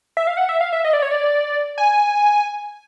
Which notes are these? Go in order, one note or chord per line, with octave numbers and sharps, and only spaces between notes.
E5
F5
F#5
E5
F5
E5
D#5
D5
C#5
D5
G#5